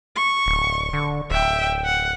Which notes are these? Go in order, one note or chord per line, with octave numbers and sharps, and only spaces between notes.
C#6
D1
D3
D1 E5 G5
F#5